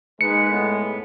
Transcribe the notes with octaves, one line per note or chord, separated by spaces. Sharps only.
G#3 A#3 D#4 B4 C#7
A2 B3